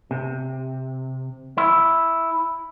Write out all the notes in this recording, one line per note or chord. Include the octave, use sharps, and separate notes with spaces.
C3
E4